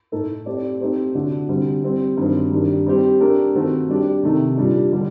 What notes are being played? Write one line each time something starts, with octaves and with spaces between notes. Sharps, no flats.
A2 A3 D#4 A4
A3 C4 G4 D5
A3 C4 D#4 G4 C5
D3 A3 D4 F#4
D3 G3 C4
G3 C4 G4
G2 D#3 F#3 C4
G2 D#3 G3 D4
G3 C4 G4 C5
A3 D4 G4 A#4
D#3 A3 C4 F#4
G3 D4 G4
C3 D#3 A3 D#4
A#2 G3 D4
D3 G3 D4